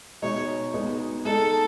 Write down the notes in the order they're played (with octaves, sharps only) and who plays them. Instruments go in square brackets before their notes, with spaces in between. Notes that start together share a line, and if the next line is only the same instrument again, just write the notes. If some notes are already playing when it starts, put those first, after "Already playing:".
[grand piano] B2 G#3 D#4 G#4 [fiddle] C#5
[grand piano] G#3 B3 D#4
[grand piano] G#3 D#4 G#4 [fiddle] A4